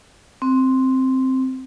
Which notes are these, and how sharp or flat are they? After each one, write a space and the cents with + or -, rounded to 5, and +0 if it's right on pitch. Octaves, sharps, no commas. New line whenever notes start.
C4 +0